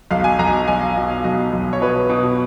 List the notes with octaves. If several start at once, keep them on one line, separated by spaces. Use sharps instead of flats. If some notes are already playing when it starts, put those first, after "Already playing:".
B1 F5
G#5
B1 A#5
G#5
B1 G#5
F5
B2 D#5
F5
B1 D#5
B1
C#5
B2 B4
B2